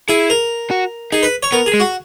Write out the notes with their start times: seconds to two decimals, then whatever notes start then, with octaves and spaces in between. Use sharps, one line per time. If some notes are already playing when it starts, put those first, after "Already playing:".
0.09 E4 G#4
0.30 A#4
0.71 F#4
1.12 D#4 G#4
1.23 B4
1.43 C#5
1.52 B3 A#4
1.66 G#4
1.74 G#3
1.80 F#4